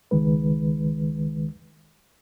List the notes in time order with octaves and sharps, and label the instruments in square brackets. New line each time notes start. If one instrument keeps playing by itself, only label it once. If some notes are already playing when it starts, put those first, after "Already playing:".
[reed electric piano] C#2 D#3 G#3 B4